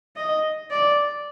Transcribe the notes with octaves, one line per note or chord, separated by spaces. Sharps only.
D#5
D5